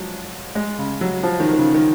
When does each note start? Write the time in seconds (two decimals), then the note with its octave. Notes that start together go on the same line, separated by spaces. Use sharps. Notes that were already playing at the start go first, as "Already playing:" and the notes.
Already playing: F3 F#3 G#3
0.55 G#3
0.78 C#3
1.01 F#3
1.23 F3
1.40 D#3
1.53 D#3
1.58 C#3
1.74 D#3